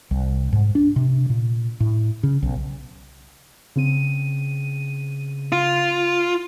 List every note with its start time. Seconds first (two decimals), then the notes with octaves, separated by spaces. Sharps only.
0.11 C2
0.53 G#2
0.75 D4
0.96 C3
1.30 A#2
1.80 A2
2.23 C#3
2.42 B1
3.76 C#3 C4 D#7
5.52 F4